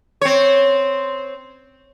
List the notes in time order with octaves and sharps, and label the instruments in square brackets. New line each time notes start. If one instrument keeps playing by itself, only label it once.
[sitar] C4 C#5